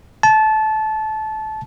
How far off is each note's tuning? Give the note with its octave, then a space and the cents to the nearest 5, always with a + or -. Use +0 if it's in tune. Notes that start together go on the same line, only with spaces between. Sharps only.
A5 -20